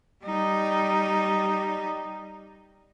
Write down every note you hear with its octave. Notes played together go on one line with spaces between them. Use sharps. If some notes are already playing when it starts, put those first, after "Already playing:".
G3 D#4